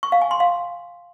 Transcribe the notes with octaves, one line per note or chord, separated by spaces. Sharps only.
C#6
F5
G#5
C6
F5